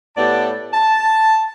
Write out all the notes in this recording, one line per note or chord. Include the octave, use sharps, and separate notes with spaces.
A2 B3 G4 D5 F#5 A5
A5